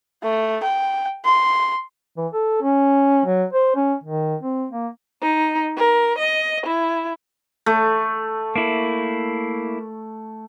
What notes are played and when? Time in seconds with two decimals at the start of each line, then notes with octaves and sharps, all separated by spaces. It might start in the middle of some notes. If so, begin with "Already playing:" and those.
0.23 A3
0.63 G5
1.25 C6
2.17 E3
2.33 A4
2.62 C#4
3.25 F#3
3.53 C5
3.75 C#4
4.04 D#3
4.43 C4
4.71 A#3
5.22 D#4
5.76 A#4
6.19 D#5
6.66 E4
7.66 A3
8.56 A#3 E4